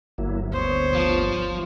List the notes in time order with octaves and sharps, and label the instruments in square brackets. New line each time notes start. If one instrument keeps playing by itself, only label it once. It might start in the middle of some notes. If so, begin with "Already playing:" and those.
[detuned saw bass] G1 [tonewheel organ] F#3 A#3 E4
[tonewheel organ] D2 B3 [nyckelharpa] C5 C#5
[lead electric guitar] F3